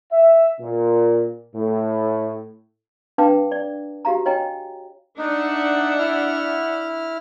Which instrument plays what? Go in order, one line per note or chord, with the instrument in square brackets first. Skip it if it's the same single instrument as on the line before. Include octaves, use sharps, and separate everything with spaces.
[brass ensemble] E5
A#2
A2
[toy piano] D4 B4 F5 G5 A5 D6
D5
F#4 G4 F5 A#5
C#5 D#5 G5 G#5 A#5
[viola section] D4 E5 F#5 [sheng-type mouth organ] D#4
[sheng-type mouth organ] E4 F6